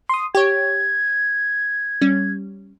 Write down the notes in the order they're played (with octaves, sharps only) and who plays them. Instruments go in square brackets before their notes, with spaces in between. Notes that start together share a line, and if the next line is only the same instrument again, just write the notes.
[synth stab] C6 D#6
[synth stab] G4 C#5 [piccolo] G#6
[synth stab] G3 C#4